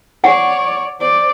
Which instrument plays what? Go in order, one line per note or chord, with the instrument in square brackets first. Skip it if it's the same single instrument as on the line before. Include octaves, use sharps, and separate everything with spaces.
[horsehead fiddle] C#5 D5 [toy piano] F#5
[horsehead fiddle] C5 D5